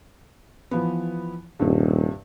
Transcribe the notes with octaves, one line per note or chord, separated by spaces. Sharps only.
E3 F3 B3
D#1 G2 C3